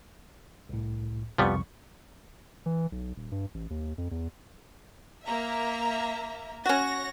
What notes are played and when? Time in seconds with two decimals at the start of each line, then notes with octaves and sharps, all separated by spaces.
0.69 C2 A2
1.38 C2 F2 F3 G3 B3 C#6
2.66 E3
2.92 B1
3.16 D#1
3.32 G2
3.54 A1
3.70 D#2
3.98 F2
4.11 E2
5.25 A#3 E5 A#5
6.66 C#4 F#4 C#5 F#5 A#6